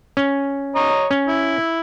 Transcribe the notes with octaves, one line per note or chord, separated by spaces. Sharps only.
C#4
C#5 D#5 A#5
C#4
E4